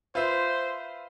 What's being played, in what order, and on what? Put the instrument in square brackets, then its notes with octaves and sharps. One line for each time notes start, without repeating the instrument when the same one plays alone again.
[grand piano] F4 B4 E5 [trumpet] C5